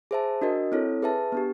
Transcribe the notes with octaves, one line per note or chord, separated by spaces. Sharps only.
G#4 C5 E5 A5
D4 F#4 A#4 D#5
C4 E4 A4 C#5
G#4 B4 E5 A5
B3 D4 G4